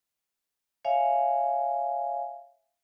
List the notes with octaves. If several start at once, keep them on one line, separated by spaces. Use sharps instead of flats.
C#5 E5 F5 G#5